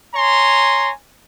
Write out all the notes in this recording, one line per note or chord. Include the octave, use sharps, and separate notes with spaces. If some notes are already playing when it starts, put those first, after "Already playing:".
C#5 G#5 A#5 C6